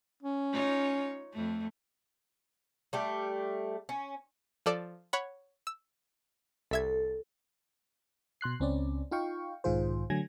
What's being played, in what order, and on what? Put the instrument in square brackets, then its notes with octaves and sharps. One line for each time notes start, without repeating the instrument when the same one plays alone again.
[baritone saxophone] C#4
[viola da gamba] D#4 F4 C#5
F2 A3
[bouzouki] G3 A3 G4
C#4
[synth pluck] F3 A4 D5
C#5 F#5 B5
E6
[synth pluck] C2 E5 G#6 [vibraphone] A4
[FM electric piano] B2 C6 F#6 C7
C#2 C4 C#4 D5
D#4 F4 F5 G5 C#6
B1 G#2 D#3 F4 G#4 C5
D3 F#3 A3 G#5 G#6 A#6